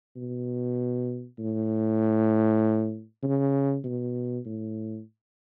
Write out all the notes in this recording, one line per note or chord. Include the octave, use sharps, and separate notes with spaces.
B2
A2
C#3
B2
A2